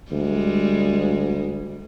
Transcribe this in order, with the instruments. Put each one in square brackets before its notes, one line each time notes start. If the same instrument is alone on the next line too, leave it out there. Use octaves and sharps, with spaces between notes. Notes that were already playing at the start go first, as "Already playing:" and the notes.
[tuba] D2 [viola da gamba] G3 G#3